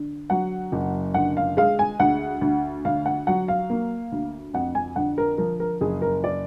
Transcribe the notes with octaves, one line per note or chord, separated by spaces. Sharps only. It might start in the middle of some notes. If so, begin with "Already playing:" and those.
Already playing: D3
F#3 F#5
F#1
D3 F#5
F5
G#3 F5
G#5
D2 F#5
D2
D3 F5
F#5
F#3 F#5
F5
A#3
D2
F2 F#5
G#5
D3 F#5
A#4
F3 A#4
A#4
F#1 G#4
A#4
D5